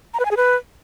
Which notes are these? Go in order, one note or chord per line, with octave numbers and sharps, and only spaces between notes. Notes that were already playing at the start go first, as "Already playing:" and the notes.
A#5
B4
G#5
G#4
B4